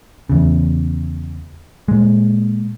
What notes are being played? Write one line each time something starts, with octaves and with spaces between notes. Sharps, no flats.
E2 C#3
A#2 G#3